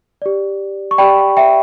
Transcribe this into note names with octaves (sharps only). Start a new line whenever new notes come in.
G4 D5
C#6
G4 D5 G5 B5
E5 G5